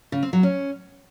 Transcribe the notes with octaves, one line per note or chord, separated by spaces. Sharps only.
C#3
C4
F#3
C#4